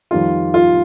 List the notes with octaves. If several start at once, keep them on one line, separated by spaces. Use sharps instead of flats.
F2 D#3 G3 F4
F4